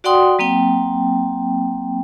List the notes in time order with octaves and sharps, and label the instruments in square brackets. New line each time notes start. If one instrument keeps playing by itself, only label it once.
[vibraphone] F#4 D5 F#5 G5 C6 D#6
F#3 A#3 C4 G5